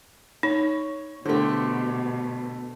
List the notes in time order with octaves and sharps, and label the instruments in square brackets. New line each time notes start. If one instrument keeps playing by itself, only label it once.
[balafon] D#4 [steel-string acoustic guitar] C#5
[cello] B2 [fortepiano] D3 A3 [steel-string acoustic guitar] G4 C5